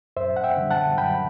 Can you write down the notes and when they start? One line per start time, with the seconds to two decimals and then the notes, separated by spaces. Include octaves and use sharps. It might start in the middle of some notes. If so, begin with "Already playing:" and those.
0.17 F#2 C5 E5
0.36 F#5
0.44 E5 G5
0.57 D3 G3
0.71 F#5 A5
0.98 F#2 G5 B5